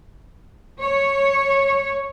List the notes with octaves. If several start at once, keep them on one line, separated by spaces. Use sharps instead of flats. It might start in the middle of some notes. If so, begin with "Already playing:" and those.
C#5